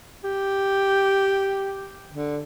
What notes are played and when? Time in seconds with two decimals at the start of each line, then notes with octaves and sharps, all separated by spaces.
0.24 G4
2.10 D3